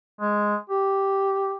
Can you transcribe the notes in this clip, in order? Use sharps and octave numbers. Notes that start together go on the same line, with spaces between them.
G#3
G4